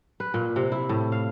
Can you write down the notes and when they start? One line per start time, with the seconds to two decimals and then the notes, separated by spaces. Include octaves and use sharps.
0.20 B4
0.34 A#2
0.56 C3
0.72 E4
0.89 A2
1.12 F5